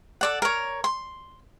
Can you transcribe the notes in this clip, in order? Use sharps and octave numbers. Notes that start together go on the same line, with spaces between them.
A4 D5 F#5
A#4 C#5
C6